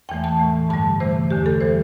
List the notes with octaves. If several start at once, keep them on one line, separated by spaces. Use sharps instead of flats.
E2 E3 A3 G5
A5
A2 E3 A3
G2 D3 G3 A5
C3 E3 A3 C5
E2 D3 A3 G4
A4
E3 G3 C5